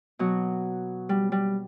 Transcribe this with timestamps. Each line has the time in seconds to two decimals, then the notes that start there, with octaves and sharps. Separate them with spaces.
0.19 B2 F#3
1.09 G3
1.32 G3